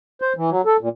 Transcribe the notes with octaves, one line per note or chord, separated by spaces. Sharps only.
C5
E3
F#3
A4
A#2